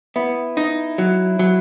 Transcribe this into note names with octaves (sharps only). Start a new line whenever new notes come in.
B3 E4
D#4
F#3
F#3